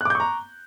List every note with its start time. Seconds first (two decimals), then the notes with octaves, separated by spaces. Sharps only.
0.01 F#6
0.05 D6
0.10 G6
0.15 C#6
0.20 A#5